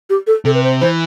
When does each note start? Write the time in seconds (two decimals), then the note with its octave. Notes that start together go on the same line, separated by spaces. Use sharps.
0.10 G4
0.27 A4
0.45 C3 A4
0.54 B4
0.63 C5
0.81 E3 C5